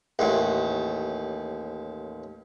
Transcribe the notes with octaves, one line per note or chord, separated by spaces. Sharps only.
A1 D#2